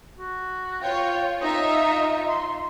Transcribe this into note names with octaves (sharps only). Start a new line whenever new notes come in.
F#4
F4 C#5 G5
D#4 F4 E5 D#6
C6